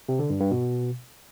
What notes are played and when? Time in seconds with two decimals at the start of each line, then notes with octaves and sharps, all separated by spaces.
0.09 C3
0.19 D3
0.30 G2
0.41 G2
0.51 B2